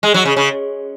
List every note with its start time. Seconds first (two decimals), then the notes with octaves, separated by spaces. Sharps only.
0.03 G#3
0.14 F#3
0.25 C#3
0.37 C#3